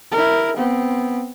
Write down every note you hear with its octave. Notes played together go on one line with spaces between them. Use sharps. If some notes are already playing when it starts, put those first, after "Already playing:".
E4 A#4
B3 C4